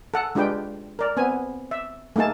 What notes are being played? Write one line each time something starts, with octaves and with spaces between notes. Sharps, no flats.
A4 F#5
G#3 D4 F4 G4 B4 G5
A#4 D5
B3 C4 G#5
E5
A3 A#3 D#4 G#4 A5